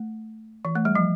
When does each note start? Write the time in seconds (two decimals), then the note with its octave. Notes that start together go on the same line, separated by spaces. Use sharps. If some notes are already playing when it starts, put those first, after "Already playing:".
Already playing: A3
0.65 E3
0.75 A3
0.85 G3
0.95 F3